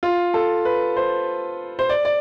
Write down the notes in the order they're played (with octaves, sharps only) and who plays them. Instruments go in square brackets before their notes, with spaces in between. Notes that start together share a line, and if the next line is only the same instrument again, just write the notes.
[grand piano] F4
A4
B4
C5
C5
D5
D5